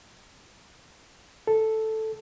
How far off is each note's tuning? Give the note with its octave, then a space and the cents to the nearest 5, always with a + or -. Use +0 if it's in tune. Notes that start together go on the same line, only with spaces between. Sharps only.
A4 +0